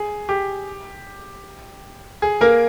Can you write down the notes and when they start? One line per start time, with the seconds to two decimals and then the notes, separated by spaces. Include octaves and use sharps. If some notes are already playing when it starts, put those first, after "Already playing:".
Already playing: G#4
0.29 G4
2.22 G#4
2.41 A#3 A#4